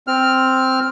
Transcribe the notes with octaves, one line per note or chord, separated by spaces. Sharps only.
C4 F6